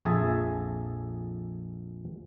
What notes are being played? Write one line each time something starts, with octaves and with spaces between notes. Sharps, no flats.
A#1 F2 G#4 E5 G#5 A5